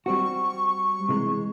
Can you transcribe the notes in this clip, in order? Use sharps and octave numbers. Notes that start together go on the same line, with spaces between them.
G3 C4 F#4 C#6
C3 E3 G#3